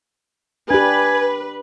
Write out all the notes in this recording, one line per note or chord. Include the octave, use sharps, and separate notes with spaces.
D4 G4 B4 G#5